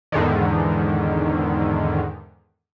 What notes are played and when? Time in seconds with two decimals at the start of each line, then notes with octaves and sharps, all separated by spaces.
0.12 E2 G#2 D3 D#3